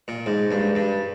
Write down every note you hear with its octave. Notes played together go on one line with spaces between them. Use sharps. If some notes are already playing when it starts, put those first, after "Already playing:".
A#2
G#2
G2
G2